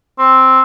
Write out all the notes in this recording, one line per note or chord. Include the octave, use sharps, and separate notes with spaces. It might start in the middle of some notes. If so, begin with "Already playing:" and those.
C4